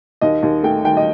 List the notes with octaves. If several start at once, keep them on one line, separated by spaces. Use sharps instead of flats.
D#2 D#5
D#2
A3 G5
D#3 G5
D#5